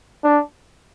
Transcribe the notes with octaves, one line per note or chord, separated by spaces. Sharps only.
D4